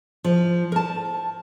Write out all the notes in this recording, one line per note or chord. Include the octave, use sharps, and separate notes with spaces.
F3
A#4 A5